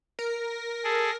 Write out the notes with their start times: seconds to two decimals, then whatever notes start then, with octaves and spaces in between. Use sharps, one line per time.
0.19 A#4
0.84 G#4 A4